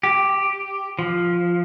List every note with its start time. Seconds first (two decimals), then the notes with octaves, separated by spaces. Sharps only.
0.03 G4
0.99 F3